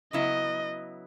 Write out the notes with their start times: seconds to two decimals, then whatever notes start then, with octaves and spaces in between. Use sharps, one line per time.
0.13 C#3 F#3 B3 E4 D#5